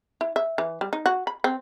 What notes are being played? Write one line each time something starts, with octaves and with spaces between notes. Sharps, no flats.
E4
E5
E3
G3
D#4
F#4
B5
C4